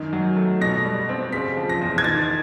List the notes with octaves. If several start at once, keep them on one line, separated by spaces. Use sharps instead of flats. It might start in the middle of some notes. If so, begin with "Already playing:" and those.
Already playing: F#2 D#3 G#3
F#3
A3
B2 A#6
G3
C4
C#3 B6
F3
A#6
E2
G#6
D#3 A6